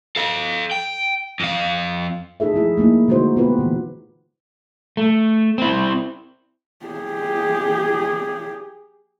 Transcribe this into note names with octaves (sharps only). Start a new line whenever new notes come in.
A4 F5
G5
F2 F5
D#4 G#4 A4 E5
F3 A3 E4 G#4
A3 A#3 D#4 E4
D3 G#3 D#4 F#4 C5
B3 F4 G4 B4
A#2 D3 E3
A3
C4 E4
G4 G#4